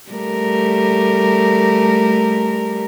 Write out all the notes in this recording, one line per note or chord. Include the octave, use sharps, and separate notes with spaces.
G3 A3 A#4